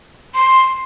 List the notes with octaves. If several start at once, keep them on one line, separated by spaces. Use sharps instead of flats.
C6